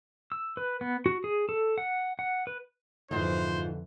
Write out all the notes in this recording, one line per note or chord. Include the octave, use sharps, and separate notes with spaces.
E6
B4
B3
F#4
G#4
A4
F#5
F#5
B4
F2 G#2 D3 E3 F4 F#4 C5